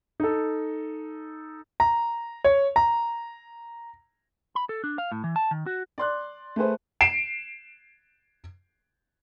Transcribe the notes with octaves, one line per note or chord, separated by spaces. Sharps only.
D#4 A4
A#5
C#5
A#5
B5
A4
D4
F5
A2
E3
A5
D#3
F#4
D5 C6 F#6
A3 G#4 B4 C5
C7 D7 E7